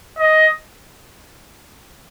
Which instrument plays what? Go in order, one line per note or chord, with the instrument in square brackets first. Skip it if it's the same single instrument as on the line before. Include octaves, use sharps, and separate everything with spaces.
[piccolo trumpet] D#5